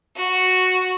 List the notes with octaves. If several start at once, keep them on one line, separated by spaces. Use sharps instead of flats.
F#4